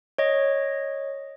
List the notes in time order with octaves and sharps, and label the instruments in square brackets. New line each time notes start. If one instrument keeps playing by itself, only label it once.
[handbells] C#5 D#5